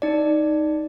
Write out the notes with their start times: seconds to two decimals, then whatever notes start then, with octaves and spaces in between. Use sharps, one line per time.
0.02 D#4 D5